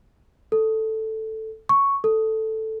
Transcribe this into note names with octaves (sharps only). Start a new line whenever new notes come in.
A4
C#6
A4